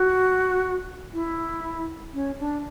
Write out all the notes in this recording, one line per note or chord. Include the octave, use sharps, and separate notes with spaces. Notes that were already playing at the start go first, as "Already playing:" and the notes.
Already playing: F#4
E4
C#4
D4